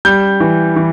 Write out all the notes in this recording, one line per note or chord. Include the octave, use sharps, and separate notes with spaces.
G3 G6
E3
E3